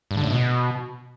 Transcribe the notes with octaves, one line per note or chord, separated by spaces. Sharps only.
G2
D3
A2
B2